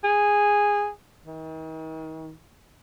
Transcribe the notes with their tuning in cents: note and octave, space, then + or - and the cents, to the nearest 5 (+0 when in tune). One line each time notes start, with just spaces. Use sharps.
G#4 -10
D#3 +40